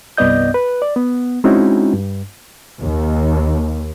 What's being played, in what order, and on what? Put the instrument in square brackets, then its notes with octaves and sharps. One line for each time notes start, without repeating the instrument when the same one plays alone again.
[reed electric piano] C2 G2 B3 D5 D#5 G6
B4
D5
B3
G#3 C4 C#4 D#4 E4 F#4
G2
[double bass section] D#2